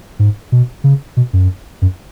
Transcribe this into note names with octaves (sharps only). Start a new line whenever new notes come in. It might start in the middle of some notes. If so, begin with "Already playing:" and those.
G#2
B2
C#3
B2
F#2
F#2